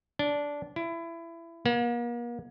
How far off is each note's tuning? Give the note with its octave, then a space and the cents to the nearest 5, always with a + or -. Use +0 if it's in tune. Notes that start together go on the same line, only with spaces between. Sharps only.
D4 -15
E4 +25
A#3 +40